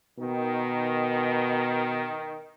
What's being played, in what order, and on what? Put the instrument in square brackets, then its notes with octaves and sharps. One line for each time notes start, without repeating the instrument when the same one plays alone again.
[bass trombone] B2 [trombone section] D#3